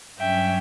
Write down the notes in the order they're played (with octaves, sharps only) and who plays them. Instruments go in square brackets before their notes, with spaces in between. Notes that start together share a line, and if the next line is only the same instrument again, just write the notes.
[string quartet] G2 F#3 C#4 E5 G5